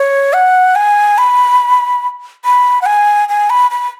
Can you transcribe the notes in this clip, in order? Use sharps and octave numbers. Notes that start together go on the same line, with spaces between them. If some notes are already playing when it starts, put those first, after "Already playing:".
Already playing: C#5
F#5
G#5
B5
B5
F#5
G#5
G#5
B5
B5